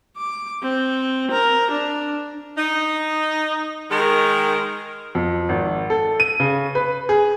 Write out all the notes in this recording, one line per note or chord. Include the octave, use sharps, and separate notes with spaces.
D6
C4
A#4
D4
D#4
D#3 G#3 A#4
F2
G#1
A4
D#7
C#3
B4
G#4